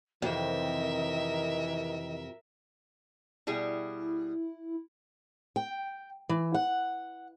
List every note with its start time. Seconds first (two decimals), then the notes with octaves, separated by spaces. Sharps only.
0.22 F2 C3 D#3 E3 A#4 E5
3.47 B2 G3 E4 G#4
5.56 G5
6.29 E3
6.54 F#5